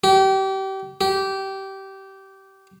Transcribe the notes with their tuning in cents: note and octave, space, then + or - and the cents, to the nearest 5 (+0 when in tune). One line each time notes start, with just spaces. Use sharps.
G4 -30
G4 -20